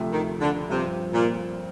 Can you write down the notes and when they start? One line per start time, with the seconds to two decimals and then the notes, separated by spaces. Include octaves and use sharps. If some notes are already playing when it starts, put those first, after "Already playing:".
Already playing: D2 C3 F3 A3
0.12 D#3
0.41 D3
0.70 G2 C3 F3 C4
1.13 A#2